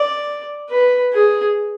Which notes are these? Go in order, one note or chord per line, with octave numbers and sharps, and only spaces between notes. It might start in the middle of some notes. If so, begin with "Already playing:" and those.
Already playing: D5
B4
G#4